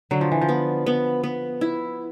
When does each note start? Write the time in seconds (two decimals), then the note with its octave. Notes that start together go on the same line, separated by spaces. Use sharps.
0.11 D3 F#3
0.21 F3
0.32 E3
0.41 F3
0.49 B3
0.87 B3
1.24 B3
1.61 E4